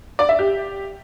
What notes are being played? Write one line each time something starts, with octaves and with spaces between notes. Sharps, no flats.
D5
E5
G4